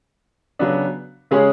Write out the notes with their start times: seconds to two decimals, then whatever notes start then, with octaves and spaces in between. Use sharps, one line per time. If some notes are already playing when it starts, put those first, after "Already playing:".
0.59 C#3 F#3 B3 D4
1.31 C#3 G#3 C#4 G#4